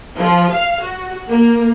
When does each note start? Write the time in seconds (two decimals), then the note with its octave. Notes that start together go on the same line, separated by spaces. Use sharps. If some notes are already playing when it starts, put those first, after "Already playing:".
0.20 F3
0.51 F5
0.81 F#4
1.28 A#3